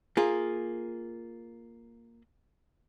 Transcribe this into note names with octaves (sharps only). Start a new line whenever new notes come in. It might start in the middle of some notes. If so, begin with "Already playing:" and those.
A#3 F4 G#4